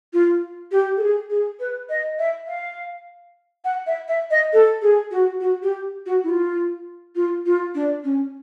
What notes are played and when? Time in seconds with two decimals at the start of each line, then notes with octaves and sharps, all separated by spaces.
0.13 F4
0.72 G4
0.97 A4
1.01 G#4
1.30 G#4
1.60 B4
1.89 D#5
2.19 E5
2.48 F5
3.65 F#5
3.87 E5
4.08 E5
4.31 D#5
4.53 A4
4.82 G#4
5.11 F#4
5.40 F#4
5.63 G4
6.06 F#4
6.24 E4
6.29 F4
7.16 F4
7.46 F4
7.75 D4
8.04 C#4